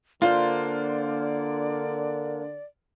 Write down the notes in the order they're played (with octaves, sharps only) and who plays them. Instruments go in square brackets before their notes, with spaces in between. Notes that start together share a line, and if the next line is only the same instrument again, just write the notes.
[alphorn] D3 [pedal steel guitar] A#3 D4 C5 [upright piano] F4 [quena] D5